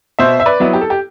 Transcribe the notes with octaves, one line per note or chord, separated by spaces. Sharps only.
B2 C5 E5
E5
B4 D5
F#3 B3 E4
G4
A4
G4